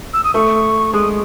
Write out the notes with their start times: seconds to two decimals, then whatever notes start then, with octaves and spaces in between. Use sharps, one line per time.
0.14 E6
0.24 D#6
0.34 A3 C#6
0.93 G#3 D#6